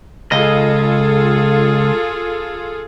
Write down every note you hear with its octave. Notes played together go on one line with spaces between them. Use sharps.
C#2 F4 G#4 A4 D#5